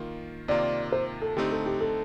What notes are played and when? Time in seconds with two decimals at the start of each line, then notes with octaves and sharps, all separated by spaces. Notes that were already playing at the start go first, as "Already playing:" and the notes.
Already playing: D#3 A#3 F4
0.48 C3 D#3 A#3 F4 D5
0.92 C5
1.22 A4
1.37 D3 A3 C4 D#4 G4
1.51 A4
1.66 G4
1.81 A4